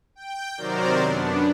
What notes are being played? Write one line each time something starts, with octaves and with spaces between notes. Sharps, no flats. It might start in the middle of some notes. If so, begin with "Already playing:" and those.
G5
C3 D#3 F#3 A#4 C5 D5
F#2 B3 D4